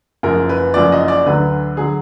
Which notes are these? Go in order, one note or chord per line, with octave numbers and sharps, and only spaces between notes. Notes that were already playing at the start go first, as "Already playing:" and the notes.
F#1 F#2 F3 A#4
B4
F#1 F#2 F3 D5
D#5
D5
D2 D3 F#3 B4
D3 F#3 G#4